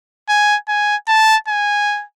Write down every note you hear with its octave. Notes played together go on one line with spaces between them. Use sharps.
G#5
G#5
A5
G#5